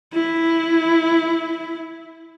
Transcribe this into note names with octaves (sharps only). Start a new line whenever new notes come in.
E4